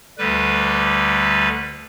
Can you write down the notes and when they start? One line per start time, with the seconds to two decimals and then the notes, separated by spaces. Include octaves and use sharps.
0.18 D2 D3 G3 B4